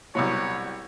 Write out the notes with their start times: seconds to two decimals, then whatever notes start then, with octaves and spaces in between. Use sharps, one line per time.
0.15 C2 B2 F#3 C#5